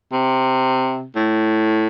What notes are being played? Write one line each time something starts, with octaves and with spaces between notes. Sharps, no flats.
C3
A2